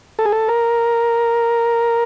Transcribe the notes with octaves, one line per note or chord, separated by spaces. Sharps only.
A4
G#4
A4
A#4